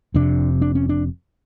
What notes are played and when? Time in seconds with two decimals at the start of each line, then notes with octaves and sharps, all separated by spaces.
0.14 F1 F2 C3 D4
0.61 D4
0.75 C#4
0.89 D4